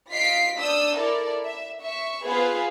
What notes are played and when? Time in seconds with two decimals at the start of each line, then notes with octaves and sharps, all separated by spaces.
0.11 F4 D#5 B6 C7 D7
0.57 D4 D5 D#6 E6 G6
0.97 E4 A4 A#4 D5
1.45 E5
1.81 E5 C#6
2.25 B3 F4 G#4 B4 C5